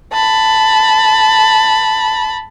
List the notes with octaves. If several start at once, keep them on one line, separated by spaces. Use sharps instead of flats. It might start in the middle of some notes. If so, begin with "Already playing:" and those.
A5 B5